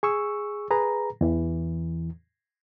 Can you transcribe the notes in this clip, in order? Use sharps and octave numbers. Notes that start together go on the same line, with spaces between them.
G#4 C#6 E6
G#4 B4 A#5
E2 E3